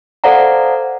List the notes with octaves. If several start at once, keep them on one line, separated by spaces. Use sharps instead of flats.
A4 C5 D5 F5 F#5 A#5